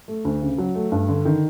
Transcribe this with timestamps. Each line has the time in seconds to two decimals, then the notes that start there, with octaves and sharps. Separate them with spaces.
0.08 A3
0.25 D2
0.42 C#3
0.58 F#3
0.75 A3
0.92 G2
1.09 D3
1.25 D#3